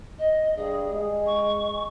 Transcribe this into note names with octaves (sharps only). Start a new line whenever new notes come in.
D#5
G2 G#4
G#3
C#6